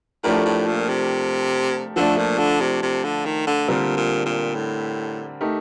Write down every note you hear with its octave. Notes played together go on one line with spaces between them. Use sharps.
A2 F3 A3 D4 G4 A#4
A2
A#2
C3
D3 F3 A3 D4
A#2
D3
C3
C3
D3
D#3
D3
A#2 D3 G3 C4 G4 A#4
A#2
A#2
A2
A3 D#4 G4 A#4